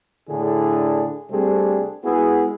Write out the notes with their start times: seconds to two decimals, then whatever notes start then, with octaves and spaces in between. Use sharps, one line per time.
0.29 A2 D3 D4 E4 G#4
1.31 C3 G3 A3 C4 D4 G#4
2.04 G#3 B3 E4 F#4 G#4